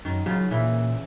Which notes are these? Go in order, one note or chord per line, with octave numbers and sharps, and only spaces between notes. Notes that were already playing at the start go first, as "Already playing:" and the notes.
F#2 D#3
C#3 F#3 F4
A#2 E3 E4